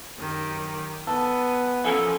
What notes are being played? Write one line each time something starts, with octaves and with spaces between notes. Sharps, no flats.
F#2 D#3 G4
B3 A4 G#5
E3 F3 A#3 C#4 A4 G#5